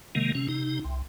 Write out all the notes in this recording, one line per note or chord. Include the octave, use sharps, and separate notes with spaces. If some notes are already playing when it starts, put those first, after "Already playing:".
C3 D#3 G#3 A#3
C3 C#4
C3 D#4
C2